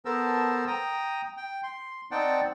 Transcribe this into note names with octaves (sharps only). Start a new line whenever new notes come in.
B3 A4 A#4 C5 A5 E6
G5 A#5 D#6
G5
C6
C4 D#4 D5 F#5 G5 A5